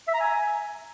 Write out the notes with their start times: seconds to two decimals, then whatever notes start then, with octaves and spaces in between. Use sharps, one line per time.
0.08 E5
0.14 A#5
0.20 G#5